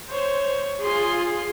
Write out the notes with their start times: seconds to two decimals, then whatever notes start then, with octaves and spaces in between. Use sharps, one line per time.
0.12 C5 C#5
0.82 F4 G#4 C6